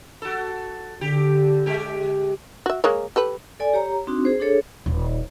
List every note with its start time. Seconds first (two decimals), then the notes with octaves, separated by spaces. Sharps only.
0.22 F#4 A4
1.01 D3 G4
1.66 G#3 G4
2.66 F#4 E5
2.84 G#3 A#3 C#5
3.16 G4 A4 B4
3.60 A4 D5 G#5
3.73 G4 C#5 A#5
4.07 C4 D4 D#4 F#4
4.25 G#4 C5
4.40 D4 G#4 A4 C#5
4.86 D#1